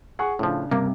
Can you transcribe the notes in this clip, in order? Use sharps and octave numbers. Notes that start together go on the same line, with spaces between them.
G#4 F#5 C#6
A2 C#3 F3 D4
G2 C3 A#3